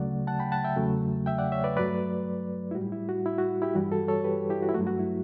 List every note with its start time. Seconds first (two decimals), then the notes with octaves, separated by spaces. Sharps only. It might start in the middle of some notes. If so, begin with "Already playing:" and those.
Already playing: D2 C#3 F#3 A3 D5 F#5
0.27 F#5 A5
0.39 G5 B5
0.52 F#5 A5
0.64 E5 G5
0.77 E2 C#3 F#3 A3
1.26 E5 G5
1.38 D5 F#5
1.52 C#5 E5
1.64 B4 D5
1.76 G2 F#3 A3 B4 D5
2.71 E4
2.75 A2 G3 F#4
2.92 E4
3.09 F#4
3.26 E4
3.38 F#4
3.62 E4 G4
3.75 G2 E3 G3 F#4
3.92 F#4 A4
4.08 A4 C#5
4.24 G4 B4
4.49 E4 G4
4.62 F#4
4.69 E4
4.74 A3 F#4
4.77 G2 F#3
4.87 F#4
4.99 E4